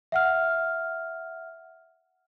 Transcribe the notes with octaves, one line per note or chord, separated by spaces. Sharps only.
E5 F#5 F6